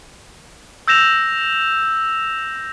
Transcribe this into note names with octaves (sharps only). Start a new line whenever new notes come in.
E6 G6 A#6 E7 F7